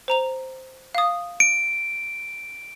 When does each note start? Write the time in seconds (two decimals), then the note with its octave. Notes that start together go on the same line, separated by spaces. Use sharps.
0.08 C5 A#5 F7
0.95 F5 D#6
1.40 D7